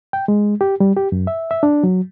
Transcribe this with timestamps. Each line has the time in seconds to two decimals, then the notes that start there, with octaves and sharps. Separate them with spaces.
0.13 G5
0.28 G#3
0.61 G4
0.80 G3
0.97 G4
1.12 F#2
1.27 E5
1.51 E5
1.63 D4
1.83 F#3